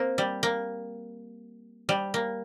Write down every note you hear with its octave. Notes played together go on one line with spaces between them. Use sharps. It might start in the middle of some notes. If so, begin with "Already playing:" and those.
Already playing: A#3 C4
G3
A#3
G3
A#3